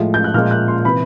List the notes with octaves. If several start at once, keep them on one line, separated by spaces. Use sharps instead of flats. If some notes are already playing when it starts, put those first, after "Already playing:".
Already playing: A2 F3 G#3
G6
F#6
A#2 F3 G#3 F6
F#6
C6
C3 E3 B5